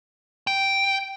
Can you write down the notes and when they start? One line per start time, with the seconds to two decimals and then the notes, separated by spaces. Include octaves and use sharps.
0.47 G5